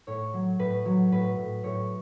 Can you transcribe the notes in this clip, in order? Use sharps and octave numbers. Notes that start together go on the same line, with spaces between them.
A2 C#5
F#3
A2 B4
F#3
A2 B4
A2
A2 C#5